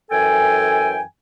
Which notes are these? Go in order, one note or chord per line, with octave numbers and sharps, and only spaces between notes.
F#2 E3 A4 G5 G#5